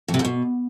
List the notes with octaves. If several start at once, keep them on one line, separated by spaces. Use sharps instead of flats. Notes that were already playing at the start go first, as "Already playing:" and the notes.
F2
C3
G#2
B2